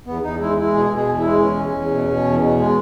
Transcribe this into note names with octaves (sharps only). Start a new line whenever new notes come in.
E2 B3
E2 D#4
G#3 E4
G#3 E4
B2 G#4
B2 G#4
E2
E4
G#3
E2 C#4
E2
E2
B2
B2
E2
B2
G#3